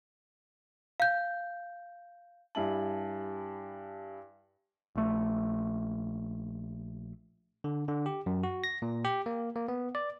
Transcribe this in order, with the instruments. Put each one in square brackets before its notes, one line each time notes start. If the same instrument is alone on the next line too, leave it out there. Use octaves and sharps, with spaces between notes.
[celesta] F5 G6
[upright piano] G2 E4 F#7 [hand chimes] G4 G#5 A5
[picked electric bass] A#1 A3
[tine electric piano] D3
D3
G4
F#2
F#4
A#6
A#2
G4
A#3
A#3
B3
D5